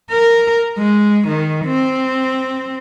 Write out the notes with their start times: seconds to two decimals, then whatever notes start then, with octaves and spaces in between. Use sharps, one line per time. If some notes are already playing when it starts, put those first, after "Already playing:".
0.11 A#4
0.78 G#3
1.28 D#3
1.65 C4